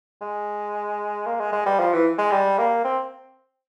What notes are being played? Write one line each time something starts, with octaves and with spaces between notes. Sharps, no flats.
G#3
A#3
G#3
G#3
G3
F3
E3
G#3
G3
A#3
C4